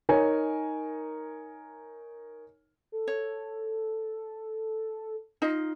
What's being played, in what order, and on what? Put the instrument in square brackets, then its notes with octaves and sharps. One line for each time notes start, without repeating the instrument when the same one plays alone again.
[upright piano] D#4 A#4 C#5 G#5
[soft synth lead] A4
[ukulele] C#5
D#4 F4 D#5